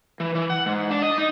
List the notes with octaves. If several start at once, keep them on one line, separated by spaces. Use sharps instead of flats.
E3
E3
F#5
G#2
D4
D#5
D#4